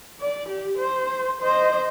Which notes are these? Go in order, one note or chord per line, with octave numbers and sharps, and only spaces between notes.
D5
G4
C5
C5 D#5